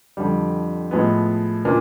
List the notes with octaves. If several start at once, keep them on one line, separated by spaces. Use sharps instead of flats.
F2 D3 G3
A2 F3 G#3 B3
A#2 A#3 D4